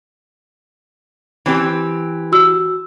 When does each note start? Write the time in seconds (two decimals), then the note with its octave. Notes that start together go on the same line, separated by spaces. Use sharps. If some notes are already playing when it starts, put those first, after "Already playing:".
1.46 E3 C4 G4
2.32 F#4 E6